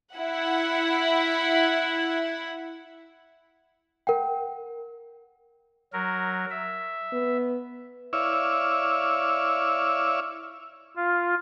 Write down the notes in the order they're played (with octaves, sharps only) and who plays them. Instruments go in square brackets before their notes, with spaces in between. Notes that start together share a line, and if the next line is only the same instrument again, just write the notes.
[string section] E4 F#5
[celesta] A#4 F#5 G5
[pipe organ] F#3 A#4
E5
[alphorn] B3
[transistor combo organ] E4 C#5 D5 E5 F5
[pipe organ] F4